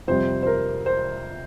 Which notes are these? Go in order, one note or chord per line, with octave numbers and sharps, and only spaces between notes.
F2 C3 G3 C5
C5
A#4
C5